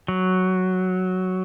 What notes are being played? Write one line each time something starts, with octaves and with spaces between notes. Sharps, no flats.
F#3